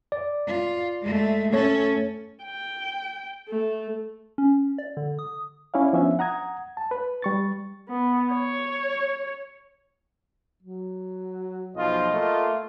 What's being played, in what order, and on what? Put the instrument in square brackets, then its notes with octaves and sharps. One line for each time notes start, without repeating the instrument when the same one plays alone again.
[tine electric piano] D5
[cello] F4
G#3 A3
[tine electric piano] A3 C#5 [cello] C#4 A4
[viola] G5
A3
[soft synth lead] C#4
D5
D3
D#6
[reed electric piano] C#4 E4 D5 F5
F3 B3 C#4 D4 E5
F#5 A#5 D#6 G#6
A5
B4
G3 C#6 A6
[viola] B3
C#5
[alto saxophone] F#3
[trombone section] B1 F3 F4 [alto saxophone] D#5
[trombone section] A3 A#3 F4